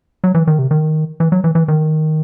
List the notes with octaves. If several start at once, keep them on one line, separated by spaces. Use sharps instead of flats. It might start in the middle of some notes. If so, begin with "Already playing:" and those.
F#3
E3
D#3
C3
D#3
E3
F#3
E3
E3
D#3